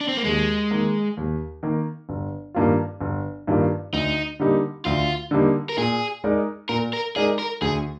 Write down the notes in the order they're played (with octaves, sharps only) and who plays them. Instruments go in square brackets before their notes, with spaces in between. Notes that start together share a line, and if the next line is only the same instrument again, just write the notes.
[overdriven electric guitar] D4
C4
A#3
[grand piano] D#2 [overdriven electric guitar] G#3
[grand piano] D#3 A#3
D#2
D#3 A#3
G1
G2 D#3 A#3 F4
G1
G2 D#3 A#3 F4
[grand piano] D2 [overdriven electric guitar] D#4
[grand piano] D3 G3 A#3 D#4
[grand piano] D2 [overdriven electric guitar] F4
[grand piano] D3 G3 A#3 D#4
[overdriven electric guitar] A#4
[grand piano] A#2 [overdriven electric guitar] G#4
[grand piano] G#3 D#4 A#4 D5
[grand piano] A#2 [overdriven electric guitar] A#4
[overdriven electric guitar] A#4
[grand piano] G#3 D#4 A#4 D5 [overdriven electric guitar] G#4
[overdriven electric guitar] A#4
[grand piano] D2 [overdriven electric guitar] G#4